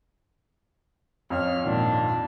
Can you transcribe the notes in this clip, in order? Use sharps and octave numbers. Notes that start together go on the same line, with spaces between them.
F2 C#5 F6
G#1 A#2 D4